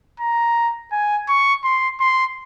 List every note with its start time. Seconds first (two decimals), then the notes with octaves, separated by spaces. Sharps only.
0.21 A#5
0.92 G#5
1.29 C#6
1.64 C6
2.00 C6